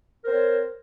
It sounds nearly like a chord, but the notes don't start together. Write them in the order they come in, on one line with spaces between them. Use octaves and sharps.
A#4 C5 C4 C#5